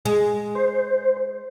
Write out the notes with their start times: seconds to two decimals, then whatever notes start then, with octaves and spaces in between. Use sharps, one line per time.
0.05 G#3
0.55 C5